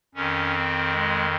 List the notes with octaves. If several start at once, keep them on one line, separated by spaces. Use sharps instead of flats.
F2 D#3 C#4
C4
G#3